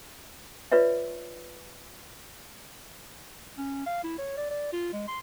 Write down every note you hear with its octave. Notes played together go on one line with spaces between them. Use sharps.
F4 B4 C#5 D5 E5
C#4
F5
E4
C#5
D5
D5
F4
G#3
C6